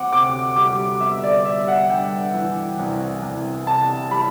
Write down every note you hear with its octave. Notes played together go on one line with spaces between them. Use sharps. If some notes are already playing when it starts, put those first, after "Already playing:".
Already playing: D2 C4 F#5 D6
C3 D6
G3 D6
G1 E5
D5
G3 E5
F#5
G2 G5
E3
C2
C2
C3 A5
G3 B5